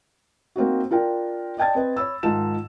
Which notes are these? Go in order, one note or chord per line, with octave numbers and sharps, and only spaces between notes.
A#3 C4 D#4 F#4
D4 F4 A#4 G5
D5 D#5 G5 A5 G#6 A6
C4 B4 D#5
C#5 B5 E6
G#2 D#3 D#4 F4 A5 E7